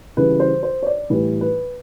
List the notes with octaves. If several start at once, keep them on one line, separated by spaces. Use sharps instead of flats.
C#3 E3 G3 B4
C5
C5
C#5
D5
A2 E3 G3 B4
B4